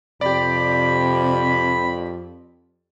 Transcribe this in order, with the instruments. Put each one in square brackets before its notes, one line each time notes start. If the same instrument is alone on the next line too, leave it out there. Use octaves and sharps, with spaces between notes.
[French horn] F2 [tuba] C3 [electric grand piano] G4 D5 [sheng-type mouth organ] B5